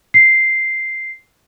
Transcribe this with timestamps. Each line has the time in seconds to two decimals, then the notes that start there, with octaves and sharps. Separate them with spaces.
0.14 C7